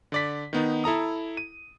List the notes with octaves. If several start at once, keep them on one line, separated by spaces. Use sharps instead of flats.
D3 D5 B6
D#3 B3 D#4
E4 A4 A#5 D#6
D#7